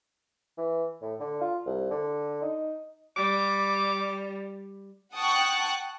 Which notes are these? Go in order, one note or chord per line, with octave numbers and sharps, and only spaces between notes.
E3
A2
D3
F4
C2
D3
D#4
G3 D6
F#5 G5 A5 C#6 D#6 F#6